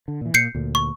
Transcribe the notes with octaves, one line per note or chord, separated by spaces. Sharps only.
D3
A#2 E3
A#2 G6 C7 C#7
D2 A#2
C#6